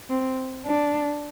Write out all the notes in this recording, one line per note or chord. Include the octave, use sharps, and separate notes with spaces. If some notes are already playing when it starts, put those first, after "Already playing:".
C4
D4